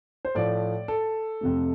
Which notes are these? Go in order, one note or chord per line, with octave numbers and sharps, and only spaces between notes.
C5
A2 F3 A3 D5
A4
F2 C3 A3